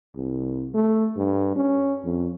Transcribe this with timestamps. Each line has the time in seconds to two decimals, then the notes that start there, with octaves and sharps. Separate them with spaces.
0.15 C2
0.74 A3
1.16 G2
1.56 C#4
2.04 F2